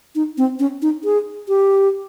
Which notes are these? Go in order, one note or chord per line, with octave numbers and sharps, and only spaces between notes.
D#4
C4
C#4
D#4
G#4
G4